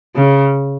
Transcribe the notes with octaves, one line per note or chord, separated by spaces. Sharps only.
C#3